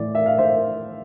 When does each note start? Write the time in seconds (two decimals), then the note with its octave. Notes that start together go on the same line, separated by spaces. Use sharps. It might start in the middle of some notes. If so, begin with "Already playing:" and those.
Already playing: A2 E3 D5
0.15 E5
0.26 F5
0.38 C5 E5